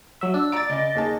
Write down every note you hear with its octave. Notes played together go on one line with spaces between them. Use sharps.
F#3 E5
D4 E6
D5 A#5 D6 A6 D7
C#3 D#5
D#2 G#4 A5